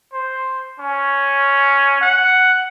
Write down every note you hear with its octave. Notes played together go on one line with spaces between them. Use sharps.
C5
C#4
F#5